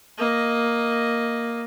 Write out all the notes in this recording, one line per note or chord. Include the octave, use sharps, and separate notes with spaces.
A#3 D#5